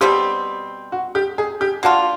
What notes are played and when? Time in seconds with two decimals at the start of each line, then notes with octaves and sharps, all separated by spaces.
0.01 B2 G3 C4 G4
0.92 F#4
1.15 G4
1.38 G#4
1.61 G4
1.83 A#3 D4 F4 F#4